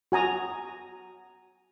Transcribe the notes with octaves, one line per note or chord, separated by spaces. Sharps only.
F#4 G#5 A#5 D#6